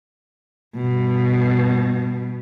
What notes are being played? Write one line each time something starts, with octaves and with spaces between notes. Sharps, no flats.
G2 B2